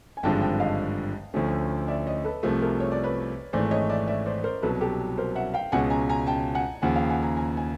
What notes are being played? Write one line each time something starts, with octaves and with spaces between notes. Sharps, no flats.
G#5
G#1 G2 D3 F3 G#3 G5 A5
G5 A5
D#5 F5
D2 D3 F3 A3 C#4
D5 E5
C#5 D#5
A4 B4
C2 C3 F3 A3 G#4 A#4
G#4 A#4
C#5
D5
B4 C#5
G#1 G#2 E3 A3 C5 D5
C#5 D#5
D5 E5
D5 E5
C5 D5
A#4 C5
C2 B2 F#3 A4 B4
G4 A4
A#4 C5
E5 F#5
F5 G5
C#2 B2 G#3 C#4 F#5 G#5
G#5 A#5
G#5 A#5
G5 A5
F#5 G#5
D#2 C#3 F3 F#5 G#5
F5 G5
F#5 G#5
G#5 A#5
G#5 A#5
G#5